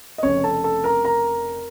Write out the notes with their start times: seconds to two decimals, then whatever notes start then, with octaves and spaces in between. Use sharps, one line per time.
0.18 D#5
0.23 F1 F2 C#3 C#4 C#5
0.44 A4 A5
0.64 A4 A5
0.84 A#4 A#5
1.04 A#4 A#5